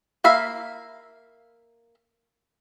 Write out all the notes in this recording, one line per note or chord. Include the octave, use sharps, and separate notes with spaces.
A#3 E5 F5 B5